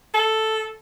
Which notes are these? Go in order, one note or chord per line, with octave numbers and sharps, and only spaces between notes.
A4